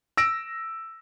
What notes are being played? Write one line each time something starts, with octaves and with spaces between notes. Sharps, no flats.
E6 A#6 D7